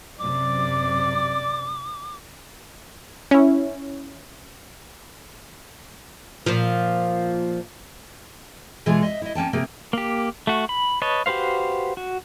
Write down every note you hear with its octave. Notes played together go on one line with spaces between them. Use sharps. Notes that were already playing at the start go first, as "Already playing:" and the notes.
F#2 C3 D5 D6
C#4 E4
A#2 F3
B2 E3 G#3 F4 G#4
D#5 E5
E4 D#5
A#3 C#4 G5 A5
C3 A#3 G#4 A#4
A#3 G4
A3 F#4
B5
B4 C#5 D#5 A5
F#4 G4 B4 C5 F5
F#4